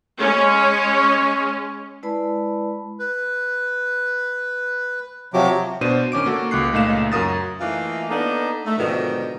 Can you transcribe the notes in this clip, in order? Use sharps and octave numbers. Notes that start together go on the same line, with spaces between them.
G#3 C#4
G#3 E4 B4 D5 A5 B5
B4
C3 F3 F#3 F#4 G4 D6
B2 D4 C5 D#7
D#3 C#4 D6 D7
A#3 F#4 A4
C#2 D6 F#6 C7
C#2 A#2 A3 D#4 F5 E7
F#2 F#4 A#4 D#6 A6
E3 A3 A#3 D#4 F4
A#3 B3 D4 D#4 A4
A3
G#2 B2 D3 D#3 F3